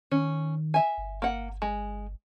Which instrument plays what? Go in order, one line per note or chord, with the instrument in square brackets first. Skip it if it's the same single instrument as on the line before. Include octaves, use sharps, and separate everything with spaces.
[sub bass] D#3 [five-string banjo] C#4
[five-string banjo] E5 G#5
[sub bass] G1
[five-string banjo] A#3 F#5
G#3